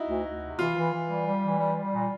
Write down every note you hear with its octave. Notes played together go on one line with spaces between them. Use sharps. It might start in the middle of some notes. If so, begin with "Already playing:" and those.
Already playing: D#4 E4 F#4
D2
D2
C3
E3 F4
E3
E3
G3
G3
E3
G3
G3
A#2